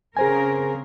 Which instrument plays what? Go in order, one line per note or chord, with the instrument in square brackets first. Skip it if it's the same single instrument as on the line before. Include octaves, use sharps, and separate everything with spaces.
[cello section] C#3 C4 A#4 [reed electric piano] G#4 C5 G#5